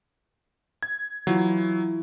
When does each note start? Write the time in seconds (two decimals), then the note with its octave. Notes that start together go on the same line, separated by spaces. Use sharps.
0.83 G#6
1.27 E3 F#3 F4